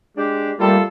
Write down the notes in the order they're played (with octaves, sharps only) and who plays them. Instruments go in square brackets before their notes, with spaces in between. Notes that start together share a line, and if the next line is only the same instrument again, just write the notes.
[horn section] G#3 D4 G4
[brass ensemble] G3 A#3 [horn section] A3 F4 A4